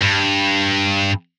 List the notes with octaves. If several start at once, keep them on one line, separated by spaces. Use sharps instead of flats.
G2